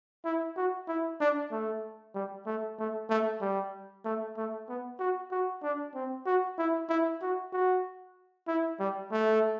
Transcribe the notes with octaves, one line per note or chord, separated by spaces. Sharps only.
E4
F#4
E4
D4
A3
G3
A3
A3
A3
G3
A3
A3
B3
F#4
F#4
D4
C4
F#4
E4
E4
F#4
F#4
E4
G3
A3